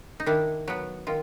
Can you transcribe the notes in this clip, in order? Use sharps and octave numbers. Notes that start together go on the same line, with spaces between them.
D#4
D#3 D4 E4
F#3 B3
D#3 F4